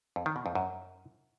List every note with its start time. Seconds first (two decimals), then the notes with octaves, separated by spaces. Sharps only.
0.16 F2
0.26 D#3
0.36 B2
0.46 F2
0.55 F#2